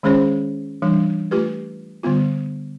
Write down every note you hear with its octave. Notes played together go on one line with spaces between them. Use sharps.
D#3 G#3 C#4 G#4 C5 C#5
E3 G3 D4
A3 F4 G4 B4
D3 G3 B3 F4